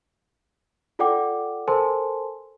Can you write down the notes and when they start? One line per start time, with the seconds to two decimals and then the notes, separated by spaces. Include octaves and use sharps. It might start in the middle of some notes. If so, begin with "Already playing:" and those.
0.99 F4 A4 D5 F#5 G5 D6
1.68 A4 A#4 C5 G#5 A5 C6